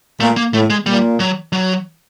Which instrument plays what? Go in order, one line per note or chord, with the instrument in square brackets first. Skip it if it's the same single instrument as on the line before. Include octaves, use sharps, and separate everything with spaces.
[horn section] A#2 [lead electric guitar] A3
[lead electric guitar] A#3
[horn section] A2 [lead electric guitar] A3
[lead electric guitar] G#3
[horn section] A#2 [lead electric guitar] G3
[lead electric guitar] F#3
F#3